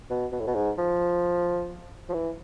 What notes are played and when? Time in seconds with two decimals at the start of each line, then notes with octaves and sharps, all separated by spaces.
0.10 B2
0.32 B2
0.40 A2
0.47 B2
0.55 G#2
0.78 F3
2.10 F3
2.14 E3